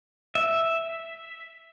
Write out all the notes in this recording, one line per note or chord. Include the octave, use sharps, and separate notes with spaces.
E5